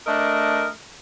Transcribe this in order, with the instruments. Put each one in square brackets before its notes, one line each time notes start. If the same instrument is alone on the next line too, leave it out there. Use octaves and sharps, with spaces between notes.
[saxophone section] A3 D4 A#4 D#5